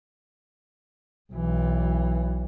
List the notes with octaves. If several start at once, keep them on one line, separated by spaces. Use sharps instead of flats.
B1 E3